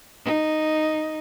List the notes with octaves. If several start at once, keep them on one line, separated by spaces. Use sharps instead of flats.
D#4